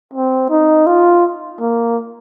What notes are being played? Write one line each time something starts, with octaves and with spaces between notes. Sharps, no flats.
C4
D#4
F4
A#3